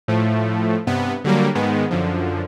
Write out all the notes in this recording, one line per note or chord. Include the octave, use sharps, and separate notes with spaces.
A2 F3 A3
G2 C3 B3
D3 F#3 G3 A#3
G#2 D#3 G#3 B3
F#2 D3 F3